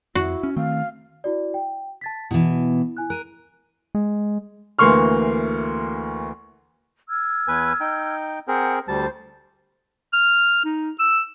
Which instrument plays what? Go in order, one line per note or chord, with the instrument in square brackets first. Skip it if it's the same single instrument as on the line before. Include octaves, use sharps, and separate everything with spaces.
[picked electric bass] F2 [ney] E4 [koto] F#4
[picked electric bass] C#4
[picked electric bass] D#3 A3 C4 [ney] F5
[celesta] E4 F#4 D5
G5
A5 A6 B6
[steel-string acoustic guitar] B2 E3 [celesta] E4
[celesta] E4 G#5 F#6
[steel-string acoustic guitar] A#4 [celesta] F#6 D#7
[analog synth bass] G#3
[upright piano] D2 E3 A#3 C6 C#6 F6
[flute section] E6 F6 G#6
[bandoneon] E2 B4 G#5
D#4 G5
[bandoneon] C4 G#4 A#4 [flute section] F#5 G6
[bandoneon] D2 G3 A5 [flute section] C5
[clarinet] F6
D#4
E6